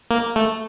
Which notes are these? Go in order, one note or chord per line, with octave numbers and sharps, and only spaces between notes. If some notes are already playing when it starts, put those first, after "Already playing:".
A#3
A3